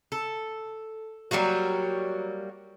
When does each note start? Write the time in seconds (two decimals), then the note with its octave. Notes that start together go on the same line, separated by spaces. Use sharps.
0.12 A4
1.31 F#3 G3 A#3 F#4